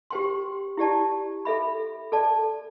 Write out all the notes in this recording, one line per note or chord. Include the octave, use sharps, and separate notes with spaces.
G4 C5 G5 C6
E4 G4 D5 A5
A4 E5 B5
A4 D5 A5